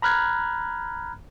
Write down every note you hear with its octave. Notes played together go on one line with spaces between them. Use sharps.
A#5 B5 F6 F#6 G#6